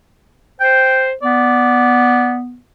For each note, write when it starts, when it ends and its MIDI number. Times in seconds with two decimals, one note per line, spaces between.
0.61 1.13 72
0.61 1.07 79
1.23 2.57 59
1.23 2.38 74